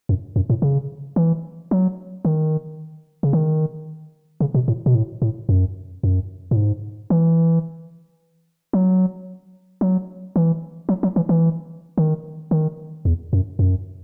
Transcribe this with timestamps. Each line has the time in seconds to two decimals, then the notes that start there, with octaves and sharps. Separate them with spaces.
0.09 F#2
0.36 F#2
0.50 A2
0.62 C#3
1.16 E3
1.71 F#3
2.25 D#3
3.23 C#3
3.33 D#3
4.40 C#3
4.54 B2
4.68 A2
4.86 B2
4.95 A2
5.22 A2
5.49 F#2
6.03 F#2
6.51 A2
6.56 G#2
7.10 E3
8.73 F#3
9.81 F#3
10.36 E3
10.89 F#3
11.03 F#3
11.16 E3
11.29 E3
11.98 D#3
12.51 D#3
13.05 E2
13.33 F#2
13.59 F#2